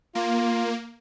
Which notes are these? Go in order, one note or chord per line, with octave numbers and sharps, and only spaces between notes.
A#3 F4